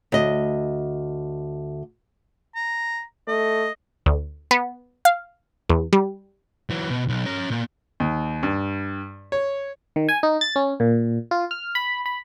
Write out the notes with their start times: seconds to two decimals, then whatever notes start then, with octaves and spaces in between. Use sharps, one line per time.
0.12 D2 D#5
2.55 A#5
3.28 A3 D#5
4.06 D2
4.51 B3
5.05 F5
5.70 E2
5.93 G3
6.70 E3 F#3
6.90 B2
7.08 B1
7.25 C#4 A#5
7.50 A#2
8.00 D#2
8.43 G2
9.32 C#5
9.96 D#3
10.09 G#5
10.23 D#4
10.41 A6
10.56 C#4
10.80 A#2
11.31 F4
11.51 F6
11.75 B5
12.06 B5